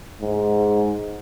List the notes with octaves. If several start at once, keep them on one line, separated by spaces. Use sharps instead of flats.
G#2